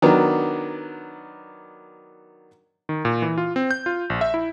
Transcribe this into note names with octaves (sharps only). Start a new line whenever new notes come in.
D#3 F#3 B3 D4
D#3
A#2
E3
F4
C4
G6
F4
A#1
E5
E4